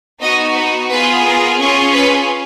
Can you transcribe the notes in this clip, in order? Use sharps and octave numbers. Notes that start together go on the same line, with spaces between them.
B3 D#4 F#4 D#5
B4
B3 F4 G#4 B4
A#4
C#4 F4 G#4
B4